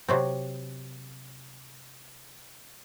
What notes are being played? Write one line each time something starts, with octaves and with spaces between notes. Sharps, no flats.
C3 F#3 C4